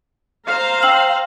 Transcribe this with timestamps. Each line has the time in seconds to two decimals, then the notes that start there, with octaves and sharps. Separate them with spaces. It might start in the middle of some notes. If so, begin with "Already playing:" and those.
0.46 C5 F5 A#5
0.83 G5 E6 F#7